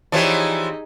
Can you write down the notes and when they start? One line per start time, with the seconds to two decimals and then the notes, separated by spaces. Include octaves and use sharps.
0.12 E3 F3 D#4 G4 G#4 C#5 D5